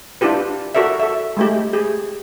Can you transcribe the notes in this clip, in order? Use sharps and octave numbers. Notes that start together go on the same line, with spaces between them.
D4 E4 F4 G4 B4
F#4 A4 A#4 D5 E5
A4 E5
G#3 A3 G4
G4 G#4